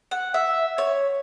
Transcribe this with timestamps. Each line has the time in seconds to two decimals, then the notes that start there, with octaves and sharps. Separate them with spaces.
0.11 F#5
0.34 E5
0.78 C#5